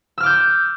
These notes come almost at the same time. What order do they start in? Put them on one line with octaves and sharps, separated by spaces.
E6 F6 D6 G6